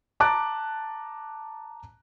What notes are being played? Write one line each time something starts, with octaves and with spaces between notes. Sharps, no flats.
A5 A#5 D6 F#6